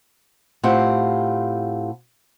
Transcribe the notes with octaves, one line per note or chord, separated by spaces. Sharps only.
A2 C4 F4 G4 F#5